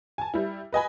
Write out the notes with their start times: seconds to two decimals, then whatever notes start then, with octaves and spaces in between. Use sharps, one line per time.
0.18 G#5 A5
0.34 G3 E4
0.73 B4 D#5 G#5 B5